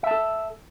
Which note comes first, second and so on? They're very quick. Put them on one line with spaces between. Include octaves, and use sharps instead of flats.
E5 A5 A4